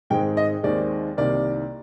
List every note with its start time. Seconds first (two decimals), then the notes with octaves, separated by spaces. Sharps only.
0.10 G#2 D#3 G#3 C4 G5
0.37 D#5
0.63 D#2 D#3 G#3 C4 D5
1.17 C2 C3 D#3 A#3 D5